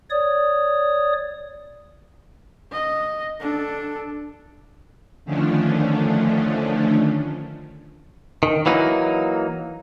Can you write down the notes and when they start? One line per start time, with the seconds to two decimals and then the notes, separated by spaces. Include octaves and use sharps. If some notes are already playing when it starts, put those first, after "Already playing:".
0.10 C#5 D5 D#6
2.72 D#5
3.40 D4 A4
5.25 D3 D#3 F3 A3 C#4 D4
8.43 D#3
8.66 E3 F#3 A#3 D#4